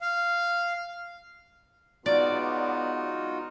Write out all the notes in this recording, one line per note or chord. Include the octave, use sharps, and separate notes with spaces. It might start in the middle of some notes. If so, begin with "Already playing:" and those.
F5
F#3 G#3 B3 D#4 F4 F#4 D5